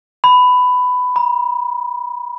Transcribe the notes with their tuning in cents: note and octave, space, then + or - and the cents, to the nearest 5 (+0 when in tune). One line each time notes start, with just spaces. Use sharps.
B5 +15
B5 -40